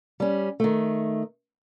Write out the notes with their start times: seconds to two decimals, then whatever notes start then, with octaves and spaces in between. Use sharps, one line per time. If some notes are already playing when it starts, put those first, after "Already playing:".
0.20 G3 C#4
0.60 D#3 A3